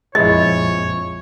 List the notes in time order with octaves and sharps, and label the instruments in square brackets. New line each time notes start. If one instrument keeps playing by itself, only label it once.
[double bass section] A#1 F2 F3 [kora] G#3 E4 [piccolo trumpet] C#5 [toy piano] D#5